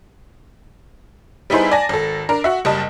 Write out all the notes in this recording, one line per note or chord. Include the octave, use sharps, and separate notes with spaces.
G3 B3 D#4 E4 G#4 C5
D5 G#5 A5 A#6
G#1 A4
D4 A#4
F#4 E5
F#1 G3 D#5 A5